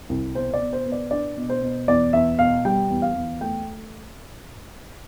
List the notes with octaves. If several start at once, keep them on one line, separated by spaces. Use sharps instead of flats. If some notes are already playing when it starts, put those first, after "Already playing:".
C2
B2 C5
D5
B2
C5
B3
D5
D4 D5
B2
C5
B2
E2 D5
E2 E5
B2 F5
G3 G5
E2
F5
E2
A3 G5